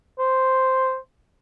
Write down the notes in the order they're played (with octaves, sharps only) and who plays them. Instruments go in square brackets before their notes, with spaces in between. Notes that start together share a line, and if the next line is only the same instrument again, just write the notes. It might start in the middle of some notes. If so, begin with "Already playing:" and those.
[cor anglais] C5